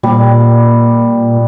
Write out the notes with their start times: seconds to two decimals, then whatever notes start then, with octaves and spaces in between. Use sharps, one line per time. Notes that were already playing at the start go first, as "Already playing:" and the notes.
0.03 A#2 G3 D5